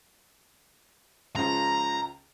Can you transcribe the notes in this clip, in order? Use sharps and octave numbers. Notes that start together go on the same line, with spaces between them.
C#2 C#3 F3 A#5